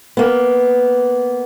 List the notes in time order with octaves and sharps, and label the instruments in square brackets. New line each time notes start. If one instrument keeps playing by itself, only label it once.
[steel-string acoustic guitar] A#3 B3